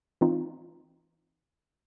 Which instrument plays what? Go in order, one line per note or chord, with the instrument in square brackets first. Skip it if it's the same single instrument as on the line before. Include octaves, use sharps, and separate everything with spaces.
[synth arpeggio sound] E3 C4 D#4 F4